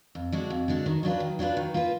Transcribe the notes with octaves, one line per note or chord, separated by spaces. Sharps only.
F2
D3 G#3 D4 F#4
F2
D3 G#3 D4 F#4
D#3
F#3 D4 F4 B4
D#3
F#3 D4 F4 B4
D#3
A#3 F4 B4